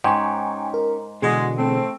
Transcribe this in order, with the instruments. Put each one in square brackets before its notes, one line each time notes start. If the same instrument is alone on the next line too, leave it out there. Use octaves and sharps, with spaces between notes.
[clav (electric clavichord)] G#2 [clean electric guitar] C#4 D#4 G4 [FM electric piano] G5 G#5 C#6
[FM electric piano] A#4
[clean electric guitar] B2 D3 E3 [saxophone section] G#3 F#4 [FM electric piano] G#4
[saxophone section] A3 C4